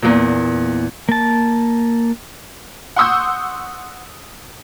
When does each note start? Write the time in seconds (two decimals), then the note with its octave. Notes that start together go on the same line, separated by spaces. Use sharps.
0.02 E2 A#2
1.09 A#3 A5
2.96 F#5 C6 C#6 D#6 E6 G6